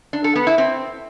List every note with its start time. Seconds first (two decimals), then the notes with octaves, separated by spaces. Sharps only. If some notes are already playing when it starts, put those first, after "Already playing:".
0.13 D4
0.24 A4
0.36 B3
0.47 E4
0.58 C4